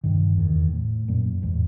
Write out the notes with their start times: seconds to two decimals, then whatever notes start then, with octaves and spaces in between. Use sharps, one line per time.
0.04 G2 C3 D#3
0.36 F1 E2 B2 D#3
0.73 A2
1.08 F#2 A#2
1.42 A1 E2 G#2